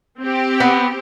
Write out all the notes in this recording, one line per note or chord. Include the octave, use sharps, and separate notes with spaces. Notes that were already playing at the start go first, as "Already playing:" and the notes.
C4 G4
B3